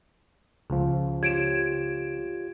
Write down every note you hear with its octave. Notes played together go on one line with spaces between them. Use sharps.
C#2 C#3 F3
F4 G4 C#5 G#6 D7 E7